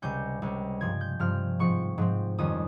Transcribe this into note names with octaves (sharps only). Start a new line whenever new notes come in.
C#2 C3 G3 C#4 G6
C#2 C3 G3 C#4
G2 F3 C4 G#6
G6
G2 F3 C4 F6
G#2 F3 C4 C#6
G#2 F3 C4
F2 D#3 G3 C#4 D#6